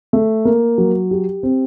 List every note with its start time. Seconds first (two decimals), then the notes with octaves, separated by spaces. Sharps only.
0.13 A3
0.45 A#3
0.78 F#3
1.11 G4
1.43 C4